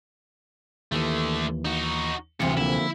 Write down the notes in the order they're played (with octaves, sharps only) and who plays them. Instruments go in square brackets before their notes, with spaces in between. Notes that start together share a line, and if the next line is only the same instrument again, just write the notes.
[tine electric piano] D#2 E3 [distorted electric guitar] D3 A3
[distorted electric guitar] D#4 F#4
[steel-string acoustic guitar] D2 C3 E3 [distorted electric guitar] G2 F4 [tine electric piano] C#7
[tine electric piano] D3 F3 A#3 [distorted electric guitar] E4